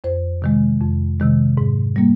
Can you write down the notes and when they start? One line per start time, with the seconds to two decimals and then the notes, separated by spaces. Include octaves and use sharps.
0.04 F2 C5
0.42 C3 D#3 G#3
0.81 F2
1.20 C3 D#3 G#3
1.58 G#2
1.96 G3 A#3